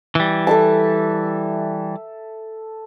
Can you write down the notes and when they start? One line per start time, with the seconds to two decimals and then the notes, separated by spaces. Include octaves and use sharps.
0.15 E3 G3
0.47 A4 E5 A5